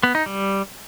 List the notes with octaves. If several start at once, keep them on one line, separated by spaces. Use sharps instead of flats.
B3
D#4
G3